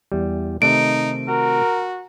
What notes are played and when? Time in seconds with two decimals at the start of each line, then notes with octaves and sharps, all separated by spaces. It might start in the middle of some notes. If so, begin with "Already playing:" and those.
0.12 E2 G3
0.62 C3 D#3 A3 D#4 D7
1.28 F#4 A#4